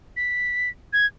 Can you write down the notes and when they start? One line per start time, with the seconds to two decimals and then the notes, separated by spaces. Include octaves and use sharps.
0.17 B6
0.93 G#6